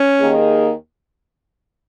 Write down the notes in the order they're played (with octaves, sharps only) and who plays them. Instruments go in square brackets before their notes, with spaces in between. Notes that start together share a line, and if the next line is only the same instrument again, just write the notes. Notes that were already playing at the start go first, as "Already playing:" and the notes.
Already playing: [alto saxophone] C#4
[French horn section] D#2 D#3 A#3 D#4 G#4